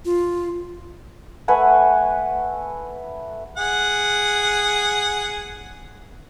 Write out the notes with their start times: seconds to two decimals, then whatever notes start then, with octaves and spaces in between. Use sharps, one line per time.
0.05 F4
1.48 A3 B4 F#5 G#5
3.57 G#4 F#5